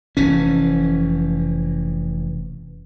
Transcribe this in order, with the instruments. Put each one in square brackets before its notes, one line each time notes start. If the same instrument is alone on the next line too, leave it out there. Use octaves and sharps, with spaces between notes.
[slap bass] F1 E3 C#4